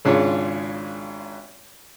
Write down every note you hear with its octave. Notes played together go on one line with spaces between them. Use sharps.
G#1 G#2 C#3 D4 F4 C#5